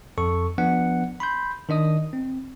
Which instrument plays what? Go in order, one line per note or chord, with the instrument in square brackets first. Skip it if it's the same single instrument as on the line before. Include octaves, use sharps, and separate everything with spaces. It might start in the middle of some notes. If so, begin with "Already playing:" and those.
[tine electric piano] F2 A4 C#6
F3 B3 D4 F#5
B5 C6 G6
D#3 D4 D#5 D#6
C4